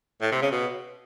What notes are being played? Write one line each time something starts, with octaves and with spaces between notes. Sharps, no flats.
A2
C3
C#3
B2